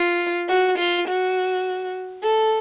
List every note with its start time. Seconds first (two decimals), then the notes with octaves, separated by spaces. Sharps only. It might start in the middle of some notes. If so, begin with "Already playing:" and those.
Already playing: F4
0.49 F#4
0.79 F4
1.08 F#4
2.23 A4